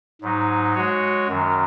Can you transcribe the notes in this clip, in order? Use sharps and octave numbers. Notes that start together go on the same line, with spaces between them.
G#2 F#3 D#4
G#3 F#4 C#5
F#2 D#3 F#3